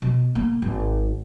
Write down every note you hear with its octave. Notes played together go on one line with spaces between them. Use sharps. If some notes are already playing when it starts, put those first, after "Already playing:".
B2
A#3
G#1